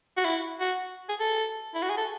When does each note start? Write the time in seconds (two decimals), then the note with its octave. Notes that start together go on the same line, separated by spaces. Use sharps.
0.17 F#4
0.25 E4
0.60 F#4
1.09 G#4
1.20 A4
1.75 E4
1.82 F#4
1.89 G#4
1.97 A4